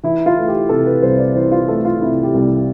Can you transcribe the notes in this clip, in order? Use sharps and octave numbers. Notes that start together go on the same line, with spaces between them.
E3 E4
F4
A3
G4
C3 A4
B4
C2 C5
D5
E3 C5
F4
A3 A4
F4
C3 E4
G4
C2